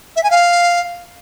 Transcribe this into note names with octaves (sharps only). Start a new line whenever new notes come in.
E5
G#5
F5